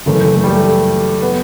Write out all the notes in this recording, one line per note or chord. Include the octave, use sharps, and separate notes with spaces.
F#1 F#2 E3 A3
A3
G3
A3
B3